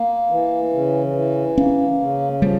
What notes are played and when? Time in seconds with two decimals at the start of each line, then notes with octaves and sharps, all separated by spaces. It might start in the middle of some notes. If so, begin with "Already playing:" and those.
Already playing: A#3
0.30 E3
0.72 C#3
1.15 E3
1.57 A#3 C#4
2.00 C#3
2.42 F3 G3